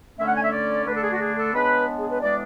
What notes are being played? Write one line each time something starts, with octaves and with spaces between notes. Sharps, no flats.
D3 A3 C#4 E5
F#5
G#5
E5
D5
D3 A3 D4 B4
A4
G#4
F#4
G#4
A4
C#3 G#3 B3 D4 B4
G#4
B4
A2 E3 G#3 B3 D4 D5